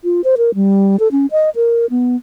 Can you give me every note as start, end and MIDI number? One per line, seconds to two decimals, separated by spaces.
0.04 0.21 65
0.24 0.35 72
0.38 0.55 70
0.55 0.99 55
1.00 1.08 69
1.12 1.26 61
1.31 1.50 75
1.56 1.86 70
1.90 2.16 59